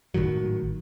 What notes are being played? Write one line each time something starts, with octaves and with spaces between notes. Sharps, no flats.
G#1 A2 D#3 F#3